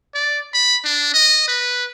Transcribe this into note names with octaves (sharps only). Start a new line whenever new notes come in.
D5
B5
D4
D#5
B4